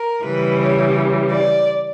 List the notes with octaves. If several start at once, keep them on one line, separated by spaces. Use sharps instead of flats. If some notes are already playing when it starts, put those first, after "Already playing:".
Already playing: A#4
C#3 E3 G3 B4
C#5
D5